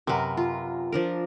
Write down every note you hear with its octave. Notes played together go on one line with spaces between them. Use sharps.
F#2 C3 A#4 B4
F4
F3 D4 A#4